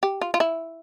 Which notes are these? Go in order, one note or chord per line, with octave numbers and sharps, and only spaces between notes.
G4
F4
F4
E4